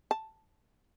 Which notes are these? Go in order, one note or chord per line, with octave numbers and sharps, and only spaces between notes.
A5